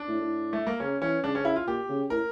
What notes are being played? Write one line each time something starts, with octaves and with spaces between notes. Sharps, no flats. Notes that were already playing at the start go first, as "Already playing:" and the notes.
Already playing: D4
A2
A2
A3
A#3
C#3 C#4
E3 C#4
C#3 D4
C#4
E4
F4
A#2 G4
C#3
A2 A#4